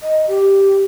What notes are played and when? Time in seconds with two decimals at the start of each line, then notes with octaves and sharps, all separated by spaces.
0.01 D#5
0.28 G4